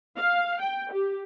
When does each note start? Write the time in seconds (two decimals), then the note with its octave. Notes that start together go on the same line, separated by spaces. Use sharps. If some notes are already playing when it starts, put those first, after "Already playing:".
0.17 F5
0.60 G5
0.92 G4